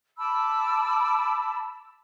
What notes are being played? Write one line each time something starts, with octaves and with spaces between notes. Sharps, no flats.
A5 B5 D6 E6